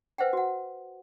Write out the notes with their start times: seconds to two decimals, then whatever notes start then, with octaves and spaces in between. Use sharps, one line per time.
0.18 B4 C5 E5 F#5 G5
0.33 F#4 F#5